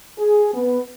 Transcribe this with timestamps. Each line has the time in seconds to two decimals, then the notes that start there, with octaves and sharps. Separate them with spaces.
0.19 G#4
0.55 B3